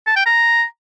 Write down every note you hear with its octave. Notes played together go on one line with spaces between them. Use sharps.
A5
G5
A#5